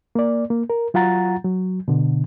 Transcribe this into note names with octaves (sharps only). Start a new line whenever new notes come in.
A#3 D5
A#3
A#4
F#3 F4 F#5 A#5 A6
F#3
B2 D3